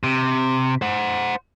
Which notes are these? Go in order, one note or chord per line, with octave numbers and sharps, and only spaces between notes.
C3
C5 F#5